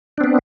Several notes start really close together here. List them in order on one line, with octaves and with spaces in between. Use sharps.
D4 C4 B3